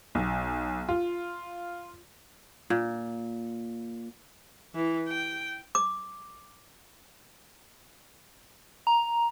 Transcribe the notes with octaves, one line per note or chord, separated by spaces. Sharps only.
B1
F4
A#2
E3
G5
D6
A#5